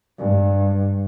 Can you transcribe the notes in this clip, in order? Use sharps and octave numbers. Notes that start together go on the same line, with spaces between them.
G2